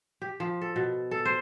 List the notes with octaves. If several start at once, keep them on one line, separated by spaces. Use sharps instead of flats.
G4
F3
A4
B2
A4
C5